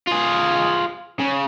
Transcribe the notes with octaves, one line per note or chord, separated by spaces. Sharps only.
F4 G#4
C#3